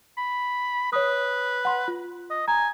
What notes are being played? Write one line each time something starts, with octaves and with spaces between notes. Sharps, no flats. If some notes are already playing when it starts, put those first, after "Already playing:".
B5
B4 C#5 D#6
F#5 C6
F4
D#5
G#5 A#5